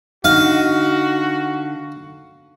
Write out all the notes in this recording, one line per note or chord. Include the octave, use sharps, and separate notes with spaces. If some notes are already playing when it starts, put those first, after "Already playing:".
D3 D#4 F#4 F5